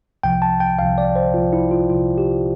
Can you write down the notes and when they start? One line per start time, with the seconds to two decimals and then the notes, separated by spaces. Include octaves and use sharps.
0.23 C2 C3 F3 G5
0.42 A5
0.60 G5
0.79 C2 C3 F3 F5
0.98 D5
1.16 C5
1.34 C2 C3 F3 F4
1.53 E4
1.71 F4
1.90 C2 C3 F3 F4
2.18 G4